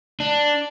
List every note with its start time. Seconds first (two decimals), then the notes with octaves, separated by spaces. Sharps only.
0.20 D4